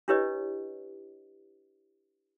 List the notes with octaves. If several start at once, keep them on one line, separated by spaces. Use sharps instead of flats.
D4 E4 G4 B4 C#5 D#5